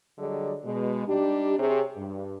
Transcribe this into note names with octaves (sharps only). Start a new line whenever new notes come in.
D3 F#3 G3 G#4 D5 D#5
B2 G#3
G3 D4 D#4 G4
C3 G#4 C#5
G2